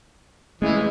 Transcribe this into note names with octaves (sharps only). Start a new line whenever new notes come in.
E3 G#3 A3 C#4